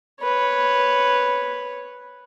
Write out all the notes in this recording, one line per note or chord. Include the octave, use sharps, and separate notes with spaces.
B4 C#5